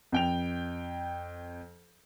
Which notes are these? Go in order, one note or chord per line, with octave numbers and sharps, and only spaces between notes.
F2 G5 F7